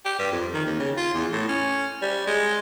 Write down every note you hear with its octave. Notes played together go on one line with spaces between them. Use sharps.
G4
G2
F2
D#3
D#2
C#3
F4
E2
A2
C#4
G3
G#3